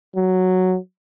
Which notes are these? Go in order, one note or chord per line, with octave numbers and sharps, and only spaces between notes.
F#3